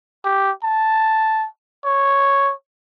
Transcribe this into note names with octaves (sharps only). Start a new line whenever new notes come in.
G4
A5
C#5